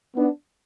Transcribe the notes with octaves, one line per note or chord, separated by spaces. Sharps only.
B3 D4